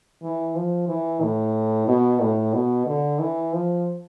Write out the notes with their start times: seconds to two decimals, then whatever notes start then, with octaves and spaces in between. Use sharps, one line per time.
0.23 E3
0.55 F3
0.88 E3
1.22 A2
1.88 B2
2.21 A2
2.53 B2
2.86 D3
3.19 E3
3.53 F3